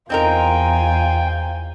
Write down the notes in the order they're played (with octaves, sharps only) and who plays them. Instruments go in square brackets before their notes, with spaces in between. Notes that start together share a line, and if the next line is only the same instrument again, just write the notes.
[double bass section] E2 [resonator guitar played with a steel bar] C4 D#4 A#4 [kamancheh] F4 G#5 [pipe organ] G5